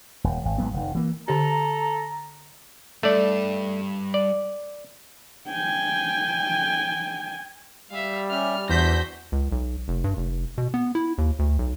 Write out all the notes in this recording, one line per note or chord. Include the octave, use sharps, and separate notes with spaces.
D#1
G#1
G#1 G#2 F#3 B3
F1 D#3
E3 A#3
D3 G4 A4 A#5
G2 A3 D5
D5
G5 G#5
G3 E5 F5
C#4 G4 E5 F6
E2 D4 F#4 C5 G6 A#6 B6
C#2
B1
F1
G2
F1
B2
B3
E4
D#2
D2
B1